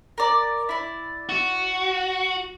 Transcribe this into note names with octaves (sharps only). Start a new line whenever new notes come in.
A#4 D5
E4 D5
F#4